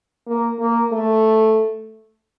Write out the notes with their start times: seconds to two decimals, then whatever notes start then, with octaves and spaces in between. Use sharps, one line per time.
0.27 A#3
0.60 A#3
0.92 A3